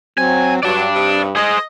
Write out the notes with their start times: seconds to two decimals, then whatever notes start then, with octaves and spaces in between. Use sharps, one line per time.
0.18 F#3 C4 G#5
0.63 G2 F#3 D5 A5
0.94 C3 D#4 G4
1.36 G#4 C5 D#5